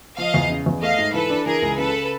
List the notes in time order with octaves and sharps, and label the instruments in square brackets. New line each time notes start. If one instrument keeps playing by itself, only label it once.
[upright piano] F3 [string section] D#5 F5
[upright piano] E2
C#3
E2
[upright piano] A3 [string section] D#5 F5
[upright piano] G#2
[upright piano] E3 [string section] A4 B4
[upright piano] D4
[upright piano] E3 [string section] G#4 A#4
[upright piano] C#2
[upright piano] C#3 [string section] A4 B4